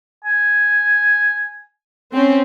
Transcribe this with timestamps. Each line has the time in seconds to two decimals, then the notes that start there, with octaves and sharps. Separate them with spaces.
0.25 G#5
2.12 C4 C#4